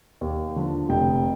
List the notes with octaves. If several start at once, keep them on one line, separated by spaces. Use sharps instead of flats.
D#2
D3 F3
F1 G5